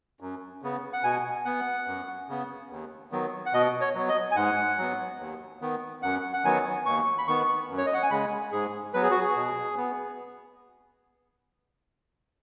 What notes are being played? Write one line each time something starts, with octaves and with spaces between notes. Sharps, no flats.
F#2
C#3 B3
F#5
B2 G#5
B3 F#5
F#2
C#3 B3
D#2
D#3 F#3 B3
F#5
B2 D#5
C#5
F#3 B3
D#5
G#5
G#2 F#5
F#3 B3
D#2
D#3 B3
F#2 F#5
F#5
D#3 F#3 B3 G#5
D#2 C#6
B5
D#3 B3 C#6
F#2
C#5
D#5
F#5
G#5
C#3 G#3 B5
G#2 G#4
F#3 B3 B4
G#4
F#4
G#4
B2
B3